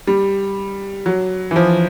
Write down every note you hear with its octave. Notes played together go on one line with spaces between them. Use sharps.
G3
F#3
E3
F3